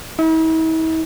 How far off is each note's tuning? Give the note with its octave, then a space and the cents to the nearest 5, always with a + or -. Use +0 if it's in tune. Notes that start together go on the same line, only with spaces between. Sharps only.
E4 -45